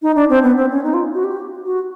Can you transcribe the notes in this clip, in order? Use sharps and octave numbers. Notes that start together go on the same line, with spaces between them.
D#4
D4
C4
B3
C4
C#4
D#4
F4
F#4
G4
F#4